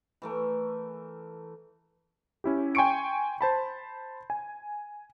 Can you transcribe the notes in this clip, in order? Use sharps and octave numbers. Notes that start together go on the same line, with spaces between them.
E3 A3 A#4
C#4 E4 G4
G5 G#5 C6 C#6 C#7 D7
C5 A5 B5
G#5